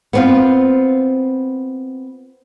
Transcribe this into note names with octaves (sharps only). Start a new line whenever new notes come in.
B3 C4 F4